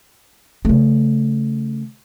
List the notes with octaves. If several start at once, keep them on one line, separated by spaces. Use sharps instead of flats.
C#3 A3